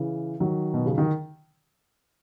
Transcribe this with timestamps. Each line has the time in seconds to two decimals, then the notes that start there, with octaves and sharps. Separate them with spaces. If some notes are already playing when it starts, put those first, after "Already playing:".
Already playing: C#3 E3
0.40 D#3 F#3
0.74 B2
0.86 C#3
0.98 D#3